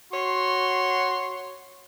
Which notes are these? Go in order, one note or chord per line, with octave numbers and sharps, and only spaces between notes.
F#4 C#5 C6